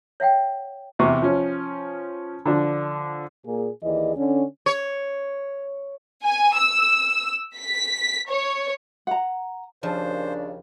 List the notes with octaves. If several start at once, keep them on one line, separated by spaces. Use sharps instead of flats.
C#5 E5 F#5 G5
E2 C3 C#6
F3 C#4
D3 F3 D4
A#2 A#3 G#4
D#2 E3 G#4 D5 D#5
D3 C#4
C#5
G#5
E6
B6
C#5
F#5 A#5
D#2 C#3 F3 D4 C5